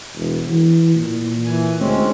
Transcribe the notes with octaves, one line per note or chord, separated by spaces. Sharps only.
E1
E3
A#2
E3 G#5
D2 G#3 C4 C#4